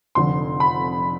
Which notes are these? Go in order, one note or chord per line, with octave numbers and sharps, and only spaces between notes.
F1 F2 D3 C6
B5